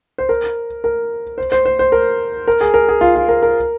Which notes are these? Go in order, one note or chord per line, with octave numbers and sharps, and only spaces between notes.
C5
A#4
A#4
C5
C5
C5
C5
A#4
A#4
G#4
A#4
G#4
F4
F4
A#4
A#4